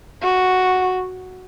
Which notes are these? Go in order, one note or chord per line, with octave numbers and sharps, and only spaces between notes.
F#4